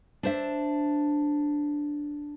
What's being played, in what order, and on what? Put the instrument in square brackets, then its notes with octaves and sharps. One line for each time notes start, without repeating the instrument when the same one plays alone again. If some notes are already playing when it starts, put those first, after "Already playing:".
[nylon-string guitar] D4 C5 E5